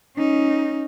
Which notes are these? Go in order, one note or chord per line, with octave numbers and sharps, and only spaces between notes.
C#4 D#4